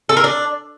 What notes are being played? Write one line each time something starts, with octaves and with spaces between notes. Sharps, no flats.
A4
A#4
D4